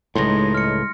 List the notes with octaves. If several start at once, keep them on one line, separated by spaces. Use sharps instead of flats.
C#2 A2 G3 G#3 D#4 C6 A#6
F6 C#7